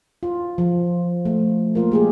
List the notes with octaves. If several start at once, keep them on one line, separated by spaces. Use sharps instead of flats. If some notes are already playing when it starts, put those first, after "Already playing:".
F4
F3
A3
A#3 F4 A#4
G#3 G4 G#4